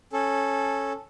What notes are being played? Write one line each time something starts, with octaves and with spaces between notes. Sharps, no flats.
C#4 A4